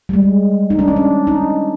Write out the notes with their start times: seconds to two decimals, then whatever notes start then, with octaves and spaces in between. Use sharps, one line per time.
0.09 G3
0.13 G#3
0.70 D#4
0.79 D4
0.88 C#4
0.96 D4
1.27 D#4